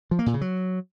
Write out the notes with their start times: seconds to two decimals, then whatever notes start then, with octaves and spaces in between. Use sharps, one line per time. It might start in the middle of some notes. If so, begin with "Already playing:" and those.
0.11 F3
0.19 A#3
0.26 A#2
0.34 C#3
0.41 F#3